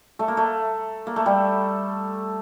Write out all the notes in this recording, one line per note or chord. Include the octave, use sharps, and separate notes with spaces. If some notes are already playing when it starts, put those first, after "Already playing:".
A3
A#3
A3
A#3
A3
G3